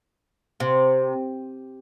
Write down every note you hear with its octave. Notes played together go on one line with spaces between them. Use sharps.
C3